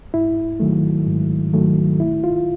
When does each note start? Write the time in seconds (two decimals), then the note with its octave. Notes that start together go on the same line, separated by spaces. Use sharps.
0.14 G#2 E4
0.60 D#3 F#3 A3
1.07 G#2
1.53 D#3 F#3 A3
2.00 C2 E4
2.24 F4